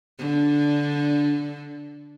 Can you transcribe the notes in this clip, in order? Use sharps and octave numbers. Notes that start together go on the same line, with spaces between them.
D3 D4